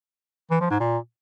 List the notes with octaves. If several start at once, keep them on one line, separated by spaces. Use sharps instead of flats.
E3
F3
G#2
A#2